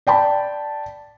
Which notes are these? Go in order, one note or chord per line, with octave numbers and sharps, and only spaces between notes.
D5 G5 A5 B5